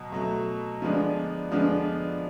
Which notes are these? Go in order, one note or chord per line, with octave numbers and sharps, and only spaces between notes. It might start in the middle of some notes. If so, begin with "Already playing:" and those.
Already playing: B2 F#3
B2 F#3 A3
D3 F3 G#3 B3 D4
D3 F3 G#3 B3 D4